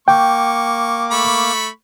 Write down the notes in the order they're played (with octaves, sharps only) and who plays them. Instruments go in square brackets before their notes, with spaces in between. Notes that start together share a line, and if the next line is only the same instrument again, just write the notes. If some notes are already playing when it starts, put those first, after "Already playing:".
[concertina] A#3 D6 [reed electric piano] G5 [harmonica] C#6
[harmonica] A3 B5 C#6